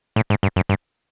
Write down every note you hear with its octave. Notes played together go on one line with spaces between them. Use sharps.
A2
G#2
G2
F#2
G2